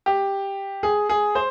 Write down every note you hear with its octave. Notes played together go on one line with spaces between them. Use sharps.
G4
G#4
G#4
C5